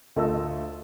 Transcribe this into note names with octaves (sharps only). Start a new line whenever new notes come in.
D2 A3 F4 D#5 E6